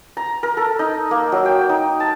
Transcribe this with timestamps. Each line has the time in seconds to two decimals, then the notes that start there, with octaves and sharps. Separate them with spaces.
0.17 A#5
0.43 A#4
0.57 A4
0.79 D#4
1.11 A#3
1.32 F#3
1.45 G5
1.69 D#4
2.00 A5